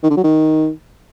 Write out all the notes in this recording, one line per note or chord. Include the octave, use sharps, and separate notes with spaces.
D#3
D3
F#3
D#3